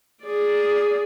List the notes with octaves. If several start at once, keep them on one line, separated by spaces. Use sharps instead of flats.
G#4 D5